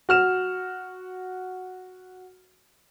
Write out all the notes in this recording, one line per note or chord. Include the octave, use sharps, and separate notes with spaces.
F#4 F6 E7